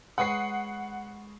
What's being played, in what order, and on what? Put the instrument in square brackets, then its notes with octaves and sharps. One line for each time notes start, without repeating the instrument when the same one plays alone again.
[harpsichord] G#3 B4 C#5 [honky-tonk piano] F#5 D#6 C7